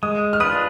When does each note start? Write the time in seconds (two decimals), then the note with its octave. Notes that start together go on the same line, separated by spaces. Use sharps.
0.03 G#3 D#6
0.33 F6
0.40 D4 F4 B4 D#6